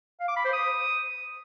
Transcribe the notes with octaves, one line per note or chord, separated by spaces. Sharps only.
F5
D6
B5
C5
D#6